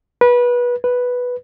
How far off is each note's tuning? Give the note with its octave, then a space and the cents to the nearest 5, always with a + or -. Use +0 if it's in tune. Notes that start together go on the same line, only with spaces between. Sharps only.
B4 -20
B4 +0